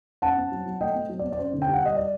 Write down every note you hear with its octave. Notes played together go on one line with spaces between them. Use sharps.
F#2 F#5 A5
C4
F#3
F#3
A3 D#5 G5
C4
F#3
D5
C4
D5
F#2 C5
D3
G5
G3
F#5
G3 D#5
D5